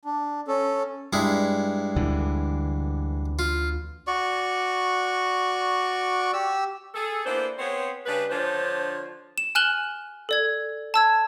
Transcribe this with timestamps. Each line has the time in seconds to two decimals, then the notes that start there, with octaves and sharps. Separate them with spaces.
0.05 D4
0.48 C#4 A4
1.13 G2 G#3 E4
1.96 D2 D3 E3
3.39 F4
4.07 F#4 D5 C#6
6.33 G4 E6
6.95 G#4 A4
7.25 A#3 B3 D4 E4 C5
7.59 B3 C4 G#4 C5 C#5
8.06 C#3 G3 D4 B4
8.30 D3 F3 D4 F4 C5 C#5
9.38 E7
9.55 G#5 F6 F#6 E7 F#7 G7
10.29 A4 D5 G#6
10.94 A5 E6 G#6